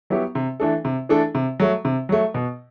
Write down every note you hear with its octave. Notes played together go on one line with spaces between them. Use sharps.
F#3 B3 E4 G4
C3
E3 A3 D4 A4
C3
E3 A3 D4 A4
C3
F#3 A3
C3
F#3 A3
B2